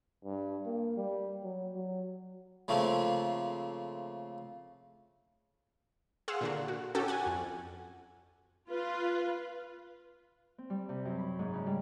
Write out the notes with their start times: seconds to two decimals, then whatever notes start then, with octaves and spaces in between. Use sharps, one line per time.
0.25 G2
0.66 A#3
0.97 G3
1.43 F#3
1.76 F#3
2.68 C#3 F3 A3 A#3 C4
6.28 G#4 F5 F#5 C6 E6
6.41 A#2 D3 F#4
6.68 F#4
6.95 C#4 F#4 G4 A4
7.08 F#5 G#5
7.26 F2
8.70 F4 B4
10.58 C4
10.70 G3
10.89 C3
11.05 F#2
11.18 B5
11.39 G#2
11.54 C#3
11.67 G3